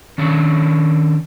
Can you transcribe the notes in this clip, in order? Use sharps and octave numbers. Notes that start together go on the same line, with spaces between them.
D#3 C#4 D4 C#5